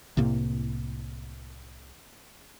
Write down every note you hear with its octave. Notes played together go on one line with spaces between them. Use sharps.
C2 A2 C3 A#3